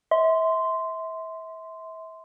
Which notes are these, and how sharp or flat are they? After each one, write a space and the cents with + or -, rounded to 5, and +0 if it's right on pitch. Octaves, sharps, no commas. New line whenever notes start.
E5 -30 C6 -10